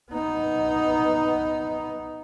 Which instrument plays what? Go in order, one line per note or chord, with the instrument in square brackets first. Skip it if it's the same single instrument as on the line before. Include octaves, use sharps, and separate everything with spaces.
[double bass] B3 D#4